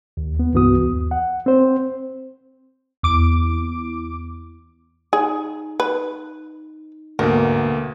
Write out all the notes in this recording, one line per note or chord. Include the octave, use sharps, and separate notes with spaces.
D#2
B3
C2 G2 E3 B3 F#4 D#6
D#2
F#5
C4 C5
E2 D6 D7
D#4 G#4
B4
D2 G#2 B2 A3 A#3 A#4